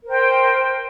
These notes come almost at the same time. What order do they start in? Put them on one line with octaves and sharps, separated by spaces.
A#4 C5 G5